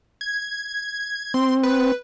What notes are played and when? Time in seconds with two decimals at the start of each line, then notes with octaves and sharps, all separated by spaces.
0.21 G#6
1.34 C4 C6
1.63 B4